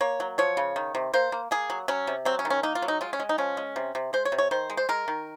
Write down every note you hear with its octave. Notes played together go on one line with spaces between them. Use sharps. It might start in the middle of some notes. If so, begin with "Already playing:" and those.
A#3 C#5
F#3
F3 C#5
C#3
D#3
C3
A#3 C5
A#3
A#3 G#4
F#3
F#3 C#4
C3
F#3 C4
C#4
D#3
C#4
A#3 D#4
F4
F#3
D#4
G#3 F4
C#4
G#3
D#4
F3 C#4
G#3
C3
C3
G#3 C5
C#5
C3
C#5
D#3 C5
G#3
C5
G#3 A#4
D#3